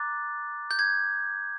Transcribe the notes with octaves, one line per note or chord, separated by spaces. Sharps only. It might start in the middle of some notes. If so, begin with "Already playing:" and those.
Already playing: A#5 D6 F#6 A6
G6
G#6